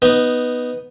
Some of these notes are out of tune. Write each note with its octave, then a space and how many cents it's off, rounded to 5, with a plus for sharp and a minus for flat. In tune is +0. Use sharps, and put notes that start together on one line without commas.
B3 +0 D#4 +0